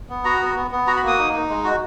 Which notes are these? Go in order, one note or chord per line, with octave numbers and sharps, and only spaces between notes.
B3
F#4 A#5
B3
B3
B3
F#4 A#5
B5
A#3 D#6
D#4
D#4
G#3
F#4